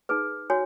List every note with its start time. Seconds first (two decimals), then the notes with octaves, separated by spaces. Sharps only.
0.09 D#4 G#4 B4
0.50 F#4 C#5 G#5